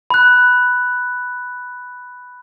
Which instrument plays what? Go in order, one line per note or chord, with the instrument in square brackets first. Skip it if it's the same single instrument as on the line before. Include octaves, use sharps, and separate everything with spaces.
[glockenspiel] B5 F#6